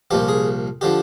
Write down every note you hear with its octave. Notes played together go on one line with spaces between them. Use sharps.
C2 A#2 F3 G4
G#4
D3 F3 G4